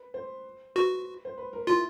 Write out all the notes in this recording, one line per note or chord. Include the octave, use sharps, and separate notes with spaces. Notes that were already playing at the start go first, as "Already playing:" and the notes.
Already playing: B4
C5
F#4 B4
C5
B4
A#4
E4 F4